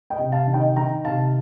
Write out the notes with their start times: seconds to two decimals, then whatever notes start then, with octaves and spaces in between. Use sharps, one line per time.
0.10 D#5 G5
0.19 C3
0.32 F5 A5
0.47 D#3
0.54 D#5 G5
0.76 D#3 G5 A#5
1.05 C3 F5 A5